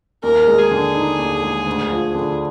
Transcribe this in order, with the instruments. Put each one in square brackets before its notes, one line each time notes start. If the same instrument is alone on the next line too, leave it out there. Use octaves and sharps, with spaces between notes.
[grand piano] D#2 [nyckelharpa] A#4
[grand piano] G#3
[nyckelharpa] G#4
[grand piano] D3
D#4
D#2
G#3
D2
F3
D3